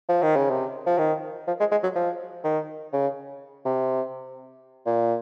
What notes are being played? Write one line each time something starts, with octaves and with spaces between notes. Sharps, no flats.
F3
D#3
C#3
C3
F3
D#3
F3
G#3
G#3
F#3
F3
D#3
C#3
C3
A#2